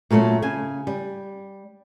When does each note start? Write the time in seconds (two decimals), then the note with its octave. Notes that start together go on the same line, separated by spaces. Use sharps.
0.11 A#2 F#3 A3 C4 C#4
0.42 C#3 G#5
0.87 G3